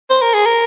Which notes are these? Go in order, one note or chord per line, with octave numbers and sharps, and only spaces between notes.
C5
A#4
G#4
A#4